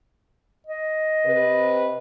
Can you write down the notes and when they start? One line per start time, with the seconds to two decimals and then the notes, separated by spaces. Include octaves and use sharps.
0.67 D#5
1.24 C3 B4